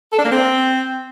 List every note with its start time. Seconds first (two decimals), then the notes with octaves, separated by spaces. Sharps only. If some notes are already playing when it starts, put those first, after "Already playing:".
0.11 A4
0.18 D4
0.24 A#3
0.30 C4